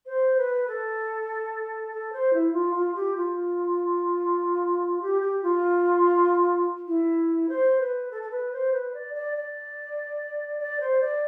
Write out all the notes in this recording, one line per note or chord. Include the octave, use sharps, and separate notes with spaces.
C5
B4
A4
A4
C5
E4
F4
F4
G4
F4
G4
G4
F4
E4
C5
B4
A4
A4
B4
C5
B4
D5
D5
D5
D5
C5
D5